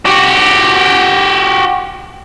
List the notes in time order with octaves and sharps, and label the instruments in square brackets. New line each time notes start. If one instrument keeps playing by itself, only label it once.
[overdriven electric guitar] F#4 G4